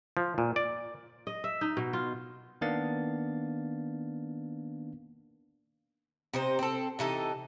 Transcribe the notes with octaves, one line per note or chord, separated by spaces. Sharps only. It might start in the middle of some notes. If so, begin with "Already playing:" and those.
F3
A#2
D5
D#5
E5
D#4
B2
F4
D#3 A#3 B3 D4 F5 A6
C3 D#4 C5
C4 A4
C3 E3 D#4 A4